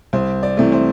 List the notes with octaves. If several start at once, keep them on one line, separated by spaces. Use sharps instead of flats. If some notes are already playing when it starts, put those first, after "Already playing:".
C2 C5
D5
C3 E3 A3
C5